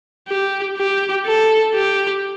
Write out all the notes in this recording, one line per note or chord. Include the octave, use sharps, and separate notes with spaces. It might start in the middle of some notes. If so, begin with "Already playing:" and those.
G4
G4
A4
G4